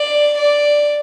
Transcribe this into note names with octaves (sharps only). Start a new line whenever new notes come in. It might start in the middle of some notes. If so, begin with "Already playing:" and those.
Already playing: D5
D5